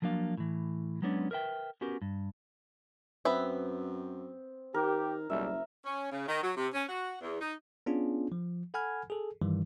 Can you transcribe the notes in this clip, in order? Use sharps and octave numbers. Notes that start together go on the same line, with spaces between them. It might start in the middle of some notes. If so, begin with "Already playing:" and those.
F3 F#3 A#3 D4 F5
A2 E3
F#3 G#3 B3 C#4 D4
A#4 B4 E5 G5
B3 C#4 F#4 G4 A#4
G2
F#2 B3 C4 B4 E5
D#3 G4 A#4
F#1 B1 G3 E5
C#4
C#3
D#3
F#3
C3
C#4
F#4
E2
D#4
B3 C#4 D4 F4 G#4
F3
A4 F#5 G#5 B5 F6 G#6
G#4 A4
G2 D#3 E3 G3